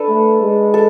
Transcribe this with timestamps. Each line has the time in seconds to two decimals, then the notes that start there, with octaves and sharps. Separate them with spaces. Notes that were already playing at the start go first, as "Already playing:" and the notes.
Already playing: D4 A4 B4
0.09 A3
0.41 G#3
0.74 A4